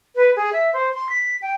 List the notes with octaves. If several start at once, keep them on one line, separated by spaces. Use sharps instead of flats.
B4
G#4
E5
C5
C6
B6
G5